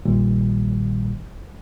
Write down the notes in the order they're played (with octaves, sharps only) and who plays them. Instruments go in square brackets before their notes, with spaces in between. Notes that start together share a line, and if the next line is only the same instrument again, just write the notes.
[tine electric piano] A#1 A#2 D#3 G3